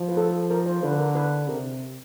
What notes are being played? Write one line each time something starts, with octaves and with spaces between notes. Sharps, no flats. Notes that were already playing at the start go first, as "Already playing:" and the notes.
Already playing: F3
B4
A4
A#4
C5
D3 B4
A#4
B4
C3 A#4